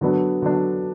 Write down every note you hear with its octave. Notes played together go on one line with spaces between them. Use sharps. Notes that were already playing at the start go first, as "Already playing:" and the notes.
D3 F#3 B3 D4
D3 F#3 B3 D4